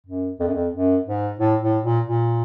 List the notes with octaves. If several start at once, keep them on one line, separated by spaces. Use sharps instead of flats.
F#2
F2
F#2
F2
F#2
G#2
A2
A2
A#2
A#2